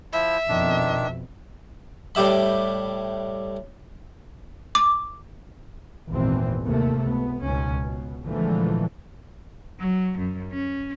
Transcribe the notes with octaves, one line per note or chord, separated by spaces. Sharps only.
F3 E4 E5
F2 B2 D#3 D4
A2 G3 G4 E5 B5
D6
G#1 E2 A#2 E3 C4
D#2 C3 A3 A#3
C#2 B3
C#2 G#2 B2 C#4
B2
A#2 D3 E3 F3 G#3 A3
F#3
F#2
C#4